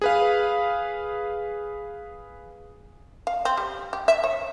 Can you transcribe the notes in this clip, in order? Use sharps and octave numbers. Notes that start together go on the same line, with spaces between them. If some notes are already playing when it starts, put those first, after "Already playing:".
G#4 B4 F5
F5
C4
G3
G4
E5
C#5